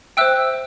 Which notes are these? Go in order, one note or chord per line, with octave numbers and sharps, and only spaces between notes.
C5 E5 G5 E6 F#6